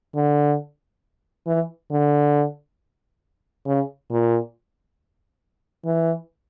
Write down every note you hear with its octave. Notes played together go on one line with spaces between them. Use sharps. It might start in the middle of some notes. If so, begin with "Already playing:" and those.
D3
E3
D3
C#3
A#2
E3